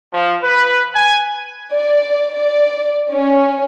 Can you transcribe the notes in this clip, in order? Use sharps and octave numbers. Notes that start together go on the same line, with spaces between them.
F3
B4
G#5
D5
D5
C#4